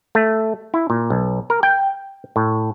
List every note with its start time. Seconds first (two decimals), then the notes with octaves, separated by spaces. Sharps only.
0.15 A3
0.74 E4
0.90 A#2
1.10 B1
1.50 A#4
1.63 G5
2.36 A2